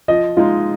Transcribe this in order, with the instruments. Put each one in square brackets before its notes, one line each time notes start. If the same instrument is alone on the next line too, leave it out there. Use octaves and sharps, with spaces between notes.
[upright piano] F3 [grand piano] D#5
[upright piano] G#3 D#4 [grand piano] F4